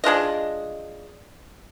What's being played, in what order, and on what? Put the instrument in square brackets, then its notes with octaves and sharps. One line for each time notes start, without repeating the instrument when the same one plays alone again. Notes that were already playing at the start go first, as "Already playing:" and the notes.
[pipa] G#3 D4 F4 D#5